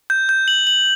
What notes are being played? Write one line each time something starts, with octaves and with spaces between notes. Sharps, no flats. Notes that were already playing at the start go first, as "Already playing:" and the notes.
G6
G6
F#7
F#7